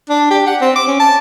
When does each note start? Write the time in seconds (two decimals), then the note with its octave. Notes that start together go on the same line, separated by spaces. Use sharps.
0.10 D4
0.30 G4
0.47 F#5
0.61 C4
0.76 D6
0.88 C#4
1.00 A5